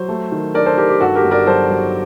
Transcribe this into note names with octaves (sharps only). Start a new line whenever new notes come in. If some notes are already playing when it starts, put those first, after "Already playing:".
Already playing: F#3 C5
A3
D#3
D4 A#4 D5
A4 C5
D#3 G4 A#4
G4
G2 F#4 A4
G4 A#4
G1
A#4 D5
F#3 A4 C5
F#3